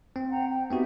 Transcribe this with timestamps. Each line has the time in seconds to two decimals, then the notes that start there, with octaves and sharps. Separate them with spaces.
0.16 C4
0.29 F#5 G5 A#5
0.47 G5
0.71 B3 C4 D#4 F#4 G4 E5